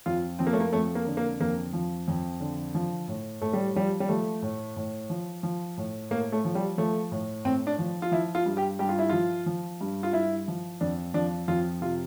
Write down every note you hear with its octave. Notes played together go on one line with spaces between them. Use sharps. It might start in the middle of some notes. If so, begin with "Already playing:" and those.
F2 F4
F3 C4
A#3
A3
A#3
F2 A3
A#3
D3
A#3
F2 A#3
F3
F2
D3
F3
A2
A2 A3
G3
F3 G3
G3
F3 A3
A2
A2
F3
F3
A2
A2 A#3
A3
F3
G3
F3 A3
A2
A2 C4
D4
F3
F4
F3 E4
F4
G2
G4
G2 G4
F4
E4
F3 F4
F3
G2
F4
G2 E4
F3
F2 D4
F3 D4
F2 F4
C3 F4